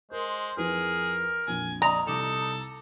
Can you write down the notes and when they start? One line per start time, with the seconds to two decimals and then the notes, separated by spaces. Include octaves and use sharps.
0.11 G#3 A#4 C5
0.57 F2 E4 G#4 A#4 B4
1.48 A#1 F2 A#2 G#5
1.82 D5 D#5 A#5
2.07 C2 D#4 A4 D6